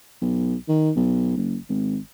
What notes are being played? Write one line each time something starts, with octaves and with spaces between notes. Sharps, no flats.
B1
D#3
B1
F#1
G#1